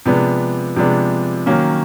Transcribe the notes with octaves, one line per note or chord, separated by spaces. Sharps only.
C3 F3 G#3 B3 D4
C3 F3 G#3 B3 D4
D#3 F#3 A#3 C#4